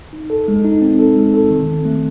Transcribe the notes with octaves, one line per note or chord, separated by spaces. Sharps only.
D#4
A4
G#3
D#4
C4
A4
G#3
A4
D#3
C4
A3